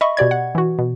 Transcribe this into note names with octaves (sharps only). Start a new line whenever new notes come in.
D#5 E5 B5 C#6
B2 G4 D5 G#6
F#5
E3 F#4
B2